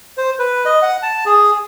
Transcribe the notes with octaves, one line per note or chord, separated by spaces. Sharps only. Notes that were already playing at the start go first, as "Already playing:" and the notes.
C5
B4
D#5
F#5
A5
G#4